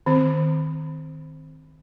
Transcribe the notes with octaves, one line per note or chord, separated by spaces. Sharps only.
D#3 C4